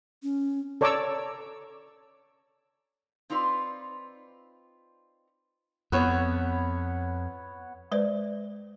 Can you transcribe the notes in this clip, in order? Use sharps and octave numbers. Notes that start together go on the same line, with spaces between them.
C#4
A4 C#5 D5 A#5 D6 E6
C4 D#4 F4 B4 D5
F2 B3 C#5
G#3 B4 C5 D5